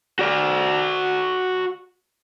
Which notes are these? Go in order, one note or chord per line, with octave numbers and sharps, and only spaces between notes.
F#4 D5